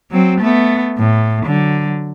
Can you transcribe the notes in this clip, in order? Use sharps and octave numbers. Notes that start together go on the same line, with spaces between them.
F#3 C4
A3 B3
A2
D3 F#3